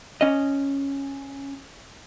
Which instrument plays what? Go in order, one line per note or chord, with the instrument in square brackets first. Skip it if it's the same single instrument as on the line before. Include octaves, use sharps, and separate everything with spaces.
[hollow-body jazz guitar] C#4 D#5